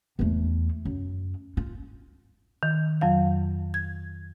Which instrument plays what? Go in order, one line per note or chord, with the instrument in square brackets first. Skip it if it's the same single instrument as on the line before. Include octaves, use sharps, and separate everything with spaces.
[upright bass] E2 A3
F#2
F4
[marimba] D#3
F2 F#3 F5
G#6